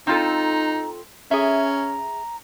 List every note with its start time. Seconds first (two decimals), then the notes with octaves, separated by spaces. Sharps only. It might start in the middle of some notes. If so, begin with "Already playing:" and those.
0.07 C4 D#4 F4 A4 A#5
1.31 C#4 G#4 E5 A#5